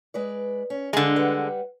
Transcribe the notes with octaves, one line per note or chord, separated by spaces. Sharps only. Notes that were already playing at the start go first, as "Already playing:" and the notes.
G#3 B4 D5
C#4
G2 D3 G#3
G3 B4 F#5